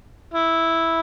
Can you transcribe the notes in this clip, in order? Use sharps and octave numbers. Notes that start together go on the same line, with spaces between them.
E4